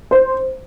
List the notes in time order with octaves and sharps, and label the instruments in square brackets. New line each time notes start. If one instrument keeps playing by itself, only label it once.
[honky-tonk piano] C5